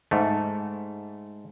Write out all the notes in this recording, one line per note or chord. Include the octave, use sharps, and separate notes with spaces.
G#2 A3